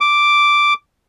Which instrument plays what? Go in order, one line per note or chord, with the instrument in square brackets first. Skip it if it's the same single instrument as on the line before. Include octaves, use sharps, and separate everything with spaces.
[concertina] D6